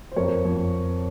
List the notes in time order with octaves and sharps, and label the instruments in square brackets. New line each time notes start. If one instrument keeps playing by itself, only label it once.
[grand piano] C5
F2 A#4 C#5
F2